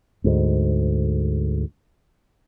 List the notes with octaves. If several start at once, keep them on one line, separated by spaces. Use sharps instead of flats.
D2 G#2